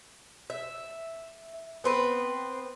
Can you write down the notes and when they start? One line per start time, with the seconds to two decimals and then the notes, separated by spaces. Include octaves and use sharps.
0.50 E5
1.84 B3 C4 B4